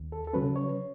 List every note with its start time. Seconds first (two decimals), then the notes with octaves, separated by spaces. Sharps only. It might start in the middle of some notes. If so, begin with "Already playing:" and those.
Already playing: D#2
0.12 A4
0.27 A4
0.33 C#3 F#3 C#4 B4
0.56 C#5